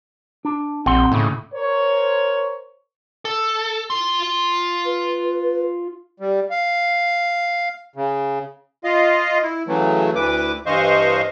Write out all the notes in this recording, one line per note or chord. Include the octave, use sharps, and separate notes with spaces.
D4
A#1 C4 F#5 C6
D#2 A2 C#3
A#4 C5 C#5
A4
F4 C6
B4
G3
F5
C#3
F4 D#5 F5
E4
C#3 E3 F#3 A3
D2 E3 B4 D6
G2 E3 C5 D#5 F5 C#6